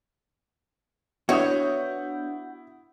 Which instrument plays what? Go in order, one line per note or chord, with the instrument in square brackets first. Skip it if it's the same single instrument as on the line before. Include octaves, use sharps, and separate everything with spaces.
[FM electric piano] B3 D4 G6 [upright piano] E4 D#6 [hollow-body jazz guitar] F#4 [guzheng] C#5